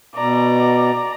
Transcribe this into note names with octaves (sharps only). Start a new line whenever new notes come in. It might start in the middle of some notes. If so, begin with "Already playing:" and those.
B2 D5 A#5